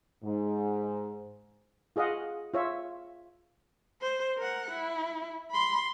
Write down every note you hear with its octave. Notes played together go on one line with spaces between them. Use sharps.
G#2
F4 G#4 D#5 F5 F#5
F4 C#5 E5
C5
A#4 F#5
E4
B5 C6